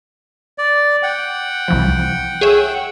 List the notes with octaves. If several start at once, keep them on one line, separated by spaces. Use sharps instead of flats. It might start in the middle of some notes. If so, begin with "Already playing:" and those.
D5
F#5 G5
C2 E3 F3
G#4 C#5 E5